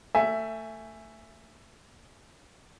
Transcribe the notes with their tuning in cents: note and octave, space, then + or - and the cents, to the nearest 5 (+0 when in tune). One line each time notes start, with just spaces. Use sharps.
A3 +25 E5 +10 G#5 +0